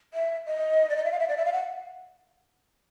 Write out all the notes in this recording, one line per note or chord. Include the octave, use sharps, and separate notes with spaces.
E5
D#5
D5
D#5
E5
F5
E5
D5
E5
F5
F#5